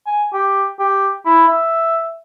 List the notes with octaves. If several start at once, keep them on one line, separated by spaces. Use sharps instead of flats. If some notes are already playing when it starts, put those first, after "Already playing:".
G#5
G4
G4
E4
E5